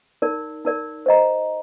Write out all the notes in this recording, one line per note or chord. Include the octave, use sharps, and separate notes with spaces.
D#4 A#4 D5
D#4 A#4 D5
C5 D#5 A#5